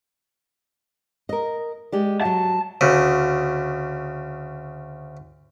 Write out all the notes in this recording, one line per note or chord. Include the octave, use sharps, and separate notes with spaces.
A#4 D#5
G#3 G4 D5
F#3 F#4 A5
D2 C#3